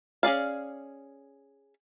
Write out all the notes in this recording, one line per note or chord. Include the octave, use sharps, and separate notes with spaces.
C#4 G#4 D5 F5